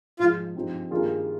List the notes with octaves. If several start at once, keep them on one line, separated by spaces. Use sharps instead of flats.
G#2 F3 G#3 F4
G2 F3 C4 D#4
G2 D#3 A#3 F4 G#4